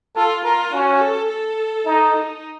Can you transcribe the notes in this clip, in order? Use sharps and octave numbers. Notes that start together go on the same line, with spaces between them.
F4 A4
F4 A#4
C#4 F#4
A4
A4
D#4
D#4